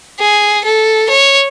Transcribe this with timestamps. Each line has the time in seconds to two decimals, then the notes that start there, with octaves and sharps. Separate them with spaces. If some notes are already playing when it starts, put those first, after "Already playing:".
0.20 G#4
0.65 A4
1.10 C#5